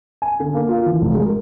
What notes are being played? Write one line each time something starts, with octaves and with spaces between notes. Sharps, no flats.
G#5
D3
A#3
F4
E3
F1
G#3
A#4